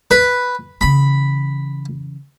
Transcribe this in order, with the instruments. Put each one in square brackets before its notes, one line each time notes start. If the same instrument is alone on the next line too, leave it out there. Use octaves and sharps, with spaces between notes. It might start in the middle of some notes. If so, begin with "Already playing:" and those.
[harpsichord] B4
[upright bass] C#3 E3 [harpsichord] B5